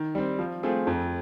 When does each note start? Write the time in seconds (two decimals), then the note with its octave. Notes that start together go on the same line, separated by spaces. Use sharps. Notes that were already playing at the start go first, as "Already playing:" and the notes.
Already playing: D#3
0.15 G3 C4
0.39 F3
0.63 A3 C4 F4 G#4
0.87 F2